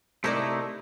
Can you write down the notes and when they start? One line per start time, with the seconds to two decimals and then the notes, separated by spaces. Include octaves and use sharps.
0.24 C3 A3 D#4 E4 A#4 D5